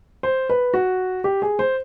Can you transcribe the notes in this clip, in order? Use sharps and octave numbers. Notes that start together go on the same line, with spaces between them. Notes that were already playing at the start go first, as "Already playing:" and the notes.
C5
B4
F#4
G4
G#4
C5